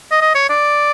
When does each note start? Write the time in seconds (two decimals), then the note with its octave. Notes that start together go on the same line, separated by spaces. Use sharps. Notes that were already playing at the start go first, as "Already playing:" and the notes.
0.11 D#5
0.21 D#5
0.35 C#5
0.49 D5